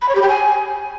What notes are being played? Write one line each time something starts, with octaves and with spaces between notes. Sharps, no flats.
B5
C#5
G4
G5
G#5